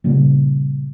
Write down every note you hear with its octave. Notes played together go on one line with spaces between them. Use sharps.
A#2 C#3 F3 G3